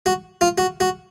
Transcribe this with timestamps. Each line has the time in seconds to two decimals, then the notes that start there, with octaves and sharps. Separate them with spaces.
0.06 F#4
0.41 F4
0.58 F#4
0.80 F#4